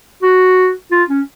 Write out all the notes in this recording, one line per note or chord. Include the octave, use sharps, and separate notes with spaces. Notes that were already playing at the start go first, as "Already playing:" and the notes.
F#4
F4
C#4